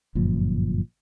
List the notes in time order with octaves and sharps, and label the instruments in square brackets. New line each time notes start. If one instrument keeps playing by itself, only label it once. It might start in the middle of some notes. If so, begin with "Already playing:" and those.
[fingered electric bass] G1 F#2 A#2 F3